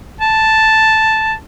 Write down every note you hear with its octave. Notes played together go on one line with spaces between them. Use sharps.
A5